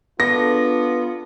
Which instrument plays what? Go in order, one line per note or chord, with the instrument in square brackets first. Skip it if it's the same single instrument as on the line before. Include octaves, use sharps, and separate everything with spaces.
[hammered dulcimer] D3 D4 G#4 [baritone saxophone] B3 [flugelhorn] F4 [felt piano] A#6